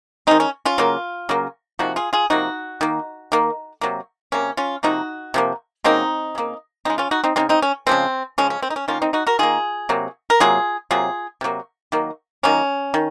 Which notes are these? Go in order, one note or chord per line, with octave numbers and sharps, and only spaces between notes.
D#3 G#3 C4 D#4
C#4
C#4 F4
C#3 F#3 A#3
C#3 F#3 A#3
C3 F3 A#3 D#4 F#4
F4 G#4
F4 G#4
C3 F3 A#3 D#4 F#4
D#3 A#3
D#3 A#3
C3 F#3 A#3
C3 F#3 A#3 C#4
C#4 F4
C3 F3 A#3 D#4 F#4
C3 F3 A#3
C#3 F#3 A#3 C4 D#4
C#3 F#3 A#3
C#3 G#3 C4 D#4
C#4 F4
D#4 F#4
C4 D#4
C#3 G#3 C4 D#4
C4 D#4
C#4
C#3 F3 G#3 C4
C#3 F3 G#3 C#4
C#4
C4
D#4
C#4
D#3 A#3 C#4 F4
C4 D#4
D#4 F#4
F#4 A#4
D#3 A#3 F4 G#4
C3 F#3 A#3
A#4
C3 F#3 A#3 F4 G#4
C3 F#3 A#3 F4 G#4
C3 F#3 A#3
D#3 F#3 A#3
D#3 F#3 A#3 C#4
D#3